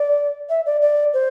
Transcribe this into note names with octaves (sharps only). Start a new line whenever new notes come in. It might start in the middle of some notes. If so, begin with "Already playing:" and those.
Already playing: D5
E5
D5
D5
C5